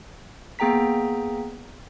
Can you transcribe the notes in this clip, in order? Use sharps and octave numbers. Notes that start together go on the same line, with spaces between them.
A#3 B3 G#4 G5 A#5 B6